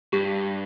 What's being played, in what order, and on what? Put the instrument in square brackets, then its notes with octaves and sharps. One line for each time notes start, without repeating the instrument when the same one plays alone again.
[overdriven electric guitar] G2 [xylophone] G4